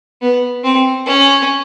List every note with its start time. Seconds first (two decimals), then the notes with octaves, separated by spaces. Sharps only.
0.22 B3
0.64 C4
1.06 C#4